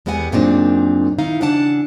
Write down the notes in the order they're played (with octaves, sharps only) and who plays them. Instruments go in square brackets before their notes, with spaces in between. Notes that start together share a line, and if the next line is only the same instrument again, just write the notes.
[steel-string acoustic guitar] E2 G#3 B3 G4 F#5 G#5
F#2 A#2 C#3 C4 D4 D#4
D#3 D#4 E4 F5
C#3 E3 D4 F#5 A5